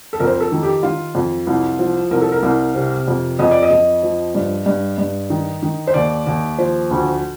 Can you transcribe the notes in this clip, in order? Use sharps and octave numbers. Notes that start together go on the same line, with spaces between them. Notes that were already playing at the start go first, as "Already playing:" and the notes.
A4
F2 A#4
C5
A#4
A4
D#3
G4
D#3 F4
F2
C2
F3
C2 A#4
A4
A#4
C2
C3
F2
F2 D#5
D5
D#5
F2
F3
G2
G2
G2
D#3
D#3
C5
D#2 D5
D#2
F3 C5
D2